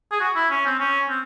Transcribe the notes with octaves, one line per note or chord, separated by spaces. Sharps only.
G#4
F#4
E4
C#4
C4
C#4
C4